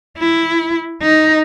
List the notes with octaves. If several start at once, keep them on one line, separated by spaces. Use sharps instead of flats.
E4
D#4